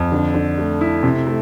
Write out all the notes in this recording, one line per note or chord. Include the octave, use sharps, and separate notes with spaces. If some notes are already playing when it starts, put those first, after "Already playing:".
Already playing: F2
D3
D3
A3
E4
C3
A3